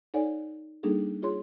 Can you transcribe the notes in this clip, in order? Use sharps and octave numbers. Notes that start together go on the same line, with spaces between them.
D#4 A4 C#5 D5 F#5 G#5
G3 A#3 D4 D#4 G#4 A4
F4 G#4 C#5 C6